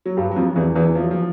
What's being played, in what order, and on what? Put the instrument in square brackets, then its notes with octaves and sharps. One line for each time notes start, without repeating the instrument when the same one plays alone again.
[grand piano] F#3
G2 G3
F#3
F2 F3
E2 E3
E2 E3
F3
F#3
F3